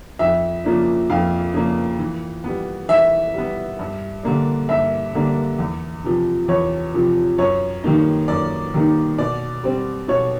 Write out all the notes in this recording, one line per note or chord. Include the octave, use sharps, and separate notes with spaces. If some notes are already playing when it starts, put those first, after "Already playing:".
F2 E5
C#3 F3 A#3 D4
F2 F5
C#3 F3 A#3 D4
E3
G3 B3
E3 E5
G3 B3
G2
D3 G3 A#3 D4
G2 E5
D3 G3 A#3 D4
E2
C3 F3
E2 C#5
C3 F3
F#2 C#5
D#3 G3 A#3 D#4
F#2 D5
D#3 G3 A#3 D#4
B2 D5
G3 C4
B2 C#5